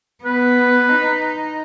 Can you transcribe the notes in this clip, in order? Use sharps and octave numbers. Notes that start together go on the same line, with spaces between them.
B3 B4
D#4